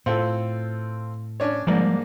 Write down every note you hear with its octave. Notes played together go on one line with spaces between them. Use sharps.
A2 C4 F4 A4
C#4 D4 C#5
G#2 F3 G3 G#3 A#3 D4